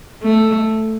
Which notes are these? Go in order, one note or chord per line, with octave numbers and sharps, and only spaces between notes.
A3